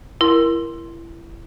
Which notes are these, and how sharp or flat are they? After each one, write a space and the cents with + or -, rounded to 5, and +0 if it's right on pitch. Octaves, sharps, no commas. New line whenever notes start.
E4 +25 A#4 +10 C6 +0